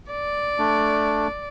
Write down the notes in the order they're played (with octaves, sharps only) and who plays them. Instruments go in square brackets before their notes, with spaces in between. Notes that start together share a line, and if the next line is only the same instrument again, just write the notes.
[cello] D5
[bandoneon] A3 D4